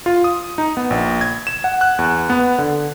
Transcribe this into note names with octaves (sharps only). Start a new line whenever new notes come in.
F4
D#6
D#4
B3
A#1
G#6
E7
F#5
F#6
E2
B3
D3